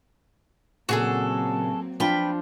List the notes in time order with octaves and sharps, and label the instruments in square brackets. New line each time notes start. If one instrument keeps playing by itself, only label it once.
[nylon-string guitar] A#2 C#3 [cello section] F#3 A#3 C4 [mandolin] F#4 G#4 A4
[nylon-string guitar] F3 D4 F4 [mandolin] B4 G5